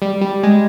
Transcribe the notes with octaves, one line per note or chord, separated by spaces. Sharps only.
G3
G3
G#3